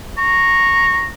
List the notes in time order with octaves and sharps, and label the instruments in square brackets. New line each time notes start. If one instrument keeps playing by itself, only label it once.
[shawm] A#5 [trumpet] C#6